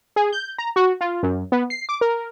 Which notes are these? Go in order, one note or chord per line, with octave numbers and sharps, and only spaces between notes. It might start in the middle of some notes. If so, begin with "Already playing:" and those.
G#4
G6
A#5
F#4
F4
F#2
B3
C7
D6
A#4